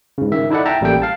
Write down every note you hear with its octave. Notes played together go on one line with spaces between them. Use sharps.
G#2 C#3
D#3 E5
D#4 E4 A4 D5 F#5
E5 G5 A5 A#5
A1 G3 A#3 A4 G5
F5 A5